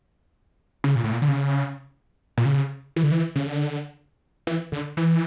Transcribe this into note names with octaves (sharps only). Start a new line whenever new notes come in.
C#3
A#2
A2
A#2
D3
C#3
A#2
C#3
E3
D3
E3
C#3
D3
E3
D3
E3